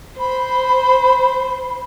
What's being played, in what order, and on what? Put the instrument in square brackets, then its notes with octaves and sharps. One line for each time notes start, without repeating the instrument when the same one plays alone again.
[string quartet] C5 [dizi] B5